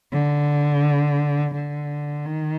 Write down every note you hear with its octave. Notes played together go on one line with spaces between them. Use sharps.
D3
D3
D#3